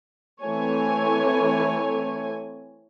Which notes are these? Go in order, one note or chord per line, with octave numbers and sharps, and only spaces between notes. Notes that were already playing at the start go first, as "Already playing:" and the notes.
E3 A3 C4 C#5 G#5